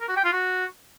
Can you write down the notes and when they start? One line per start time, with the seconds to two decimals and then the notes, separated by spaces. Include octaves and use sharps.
0.01 A#4
0.09 F#4
0.17 G5
0.24 F4
0.32 F#4